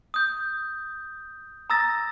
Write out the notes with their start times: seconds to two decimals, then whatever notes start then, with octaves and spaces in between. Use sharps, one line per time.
0.14 D#6 G6
1.70 A#5 D#6 E6 A6 A#6